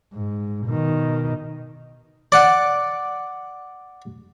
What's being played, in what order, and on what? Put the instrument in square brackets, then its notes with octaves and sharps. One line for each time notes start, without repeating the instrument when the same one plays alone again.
[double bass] G#2
B2 D#3
[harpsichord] D5 F#5